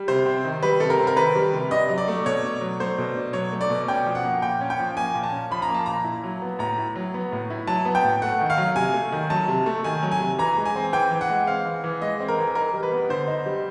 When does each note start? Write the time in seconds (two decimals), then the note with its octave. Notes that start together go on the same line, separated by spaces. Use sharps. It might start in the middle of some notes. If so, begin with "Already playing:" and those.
Already playing: G3
0.08 C3 C5
0.26 C4
0.44 D#3
0.63 G3 B4
0.80 C3 A4
0.90 A#4
0.99 C4
1.07 A#4
1.16 D#3 B4
1.36 G3
1.54 C3
1.71 D4 D#5
1.89 F#3
1.98 D5
2.08 A3
2.25 B2 C#5
2.43 D4
2.61 F#3
2.80 A3 C5
2.98 B2
3.16 D4
3.33 F#3 C#5
3.52 A3
3.61 D5
3.70 B2
3.88 C#4 G5
4.06 F3
4.15 F#5
4.24 A#3
4.42 A#2 G5
4.61 C#4
4.70 G5
4.79 F3
4.97 A#3 G#5
5.14 A#2
5.23 A5
5.32 C#4
5.51 F3 B5
5.62 A#5
5.68 A#3
5.74 A5
5.86 A#2 A#5
6.04 E4
6.24 F#3
6.42 B3
6.59 A2 A#5
6.78 E4
6.96 F#3
7.14 B3
7.32 A2
7.50 E4
7.67 F#3 A5
7.85 B3
7.95 G5
8.04 A2
8.22 A3 F#5
8.41 D#3
8.50 F5
8.58 F#3
8.76 C3 G#5
8.94 A3
9.12 D#3
9.30 F#3 A5
9.48 C3
9.66 A3
9.84 D#3 G#5
10.03 F#3
10.11 G#5
10.20 C3
10.38 E3 A#5
10.57 G#3
10.65 G#5
10.76 C4
10.93 E3 G5
11.11 E3
11.21 F#5
11.30 G#3
11.47 C4 F5
11.65 E3
11.84 E3
12.01 G#3 D#5
12.20 C4
12.28 A#4
12.38 E3
12.55 D#4 A#4
12.73 G3
12.83 B4
12.92 B3
13.10 D3 C5
13.28 D#4
13.46 G3